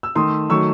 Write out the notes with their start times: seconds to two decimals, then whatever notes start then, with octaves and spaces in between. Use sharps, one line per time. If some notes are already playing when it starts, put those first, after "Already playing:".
0.03 E6
0.15 D#3 A3 C6 D#6
0.50 D#3 F#3 A3 C#6 E6